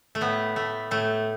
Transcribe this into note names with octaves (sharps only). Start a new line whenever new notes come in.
A3
A2 B3
A3
A2 A3